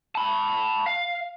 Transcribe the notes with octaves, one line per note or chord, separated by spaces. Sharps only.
A5 B5
F5